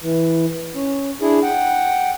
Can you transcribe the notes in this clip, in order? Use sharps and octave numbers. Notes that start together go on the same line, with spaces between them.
E3
C#4
D4 E4 G#4
F#5 G5